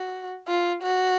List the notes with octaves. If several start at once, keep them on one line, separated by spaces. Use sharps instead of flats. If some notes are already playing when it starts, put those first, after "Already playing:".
Already playing: F#4
F4
F#4